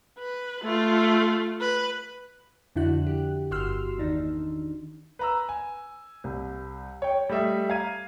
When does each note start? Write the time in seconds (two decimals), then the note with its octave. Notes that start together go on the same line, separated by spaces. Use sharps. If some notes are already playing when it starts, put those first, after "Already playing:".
0.18 B4
0.63 A3 F4
1.61 B4
2.76 F2 D3 D4 E4 F#4 F#6
3.07 G4
3.51 G1 A#3 F#4 C6 E6 F6
3.98 E2 D#3 D4 D#4
5.19 B4 A#5 E6
5.49 G#5
6.24 C2
7.02 C#5 G5
7.29 G3 A3 D#5 E5
7.70 F5 A#5 G#6 D#7